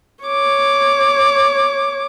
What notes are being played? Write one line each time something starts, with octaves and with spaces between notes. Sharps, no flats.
C#5 D6